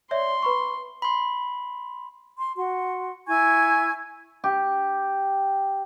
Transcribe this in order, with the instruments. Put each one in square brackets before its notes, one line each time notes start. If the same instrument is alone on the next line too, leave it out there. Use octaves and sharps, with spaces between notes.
[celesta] C#5 D5 E5 [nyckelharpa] C6
[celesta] B4 B5 C#6
[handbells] B5 C6
[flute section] C6
F#4 C6
E4 G#5 C#6 G#6
[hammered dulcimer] G4